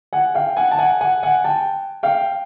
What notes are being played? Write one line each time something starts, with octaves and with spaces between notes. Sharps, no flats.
F#5 G#5
F5 G5
F#5 G#5
A5
F#5 G#5
F#5 G#5
F#5 G#5
G5 A5
F5 G5